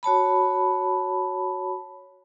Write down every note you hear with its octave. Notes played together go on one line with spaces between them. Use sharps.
F#4 C#5 A5 B5